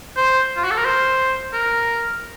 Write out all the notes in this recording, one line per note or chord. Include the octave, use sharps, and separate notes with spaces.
C5
F4
F#4
A4
A#4
C5
A#4